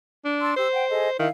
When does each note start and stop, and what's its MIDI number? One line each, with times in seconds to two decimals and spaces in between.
0.25 0.52 62
0.40 0.53 81
0.40 0.53 84
0.40 0.53 88
0.57 0.67 67
0.57 1.18 72
0.57 0.67 88
0.73 0.88 78
0.73 0.88 79
0.89 1.09 68
0.89 1.09 69
0.89 1.09 75
1.19 1.27 51
1.19 1.28 64
1.19 1.28 77